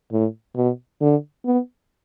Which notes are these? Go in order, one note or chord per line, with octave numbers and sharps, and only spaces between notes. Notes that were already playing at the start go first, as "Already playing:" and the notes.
A2
B2
D3
B3